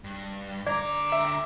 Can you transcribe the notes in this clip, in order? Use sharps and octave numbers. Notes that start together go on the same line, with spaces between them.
G2
D3 D5 A#5 D6
E5